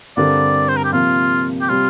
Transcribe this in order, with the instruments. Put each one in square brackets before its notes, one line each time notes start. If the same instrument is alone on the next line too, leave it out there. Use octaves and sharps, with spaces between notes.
[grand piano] G2 D3 G3 C4 A#4 [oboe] D5
[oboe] C5
A#4
G4
[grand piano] C3 F3 A#3 [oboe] F4
[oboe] G4
[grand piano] C3 G3 C4 [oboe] F4